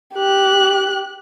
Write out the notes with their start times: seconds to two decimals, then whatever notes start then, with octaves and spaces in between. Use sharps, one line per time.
0.15 G4 F#6